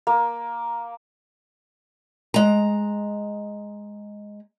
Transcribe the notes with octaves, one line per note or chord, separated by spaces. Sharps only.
A#3
G#3 A#5